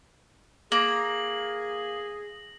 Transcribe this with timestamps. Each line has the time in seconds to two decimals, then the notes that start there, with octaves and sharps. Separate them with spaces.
0.72 A#3 G#4 A#6 F#7